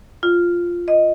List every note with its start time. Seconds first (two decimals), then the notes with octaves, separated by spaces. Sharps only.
0.23 F4
0.88 D#5